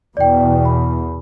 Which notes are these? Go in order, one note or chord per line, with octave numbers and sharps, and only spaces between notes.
E2 B2 D5 G5
B5